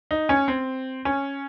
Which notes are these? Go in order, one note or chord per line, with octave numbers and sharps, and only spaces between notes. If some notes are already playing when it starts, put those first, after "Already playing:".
D#4
C#4
C4
C#4